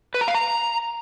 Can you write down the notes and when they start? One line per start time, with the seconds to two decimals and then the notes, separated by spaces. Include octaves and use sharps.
0.14 B4
0.21 A#5
0.28 F5
0.35 A#5